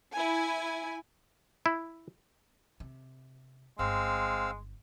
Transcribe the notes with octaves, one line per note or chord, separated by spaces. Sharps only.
E4 G#5
E4
C3
G1 G#3 C4 F5 E6